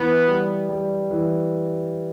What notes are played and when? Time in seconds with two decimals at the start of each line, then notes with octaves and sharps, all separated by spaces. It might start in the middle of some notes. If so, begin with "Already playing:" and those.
Already playing: E3 B3
0.28 G3
0.69 G3
1.11 E3